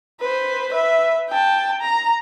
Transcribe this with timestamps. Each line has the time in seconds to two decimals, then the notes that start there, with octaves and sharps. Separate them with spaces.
0.20 B4 C5
0.72 B4 E5
1.30 G5 A5
1.81 A#5